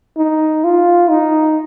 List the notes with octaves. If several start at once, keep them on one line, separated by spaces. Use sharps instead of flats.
D#4
F4
D#4